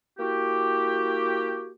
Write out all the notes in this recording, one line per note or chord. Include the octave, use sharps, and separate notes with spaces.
A#3 E4 F#4 G4